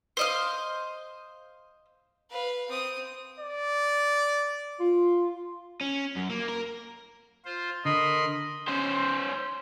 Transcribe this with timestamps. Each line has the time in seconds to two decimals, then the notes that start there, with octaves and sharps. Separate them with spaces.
0.17 C5 D#5 F5
2.31 B4 F5
2.69 C4 D#6
3.39 D5
4.80 F4
5.81 C#4
6.16 F#2
6.30 A#3
6.49 A#4
7.45 F4 C5
7.85 D3 A#4 D#5 B5 C6
8.68 C#4 C5